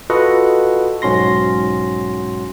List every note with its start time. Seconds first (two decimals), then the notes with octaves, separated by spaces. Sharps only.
0.10 F4 F#4 A4 B4 D#5 F#5
1.02 B1 G#2 C#4 F#4 C6 A#6